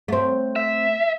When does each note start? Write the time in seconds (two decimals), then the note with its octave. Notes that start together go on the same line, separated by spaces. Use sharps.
0.08 A3 C4
0.56 E5